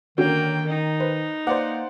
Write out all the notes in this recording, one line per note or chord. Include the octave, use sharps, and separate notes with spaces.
D3 D#3 A#3 C#4 F#4 F#5 G5
D#4
B4 C5
A#3 B4 C5 D5 F#5 D6 C7